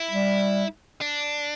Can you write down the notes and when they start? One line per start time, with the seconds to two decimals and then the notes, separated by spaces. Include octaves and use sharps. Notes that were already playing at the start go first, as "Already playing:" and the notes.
Already playing: E4
0.11 G3
1.01 D4